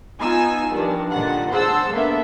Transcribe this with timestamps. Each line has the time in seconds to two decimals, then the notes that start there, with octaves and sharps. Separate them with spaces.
0.19 B3 D#4 F4 G#5 E6
0.71 G2 D#3 F3 D4
1.12 A#2 D3 D#3 F#5
1.52 G#4 C5 F#5 A5 E6
1.91 A#3 B3 D4 A4 E5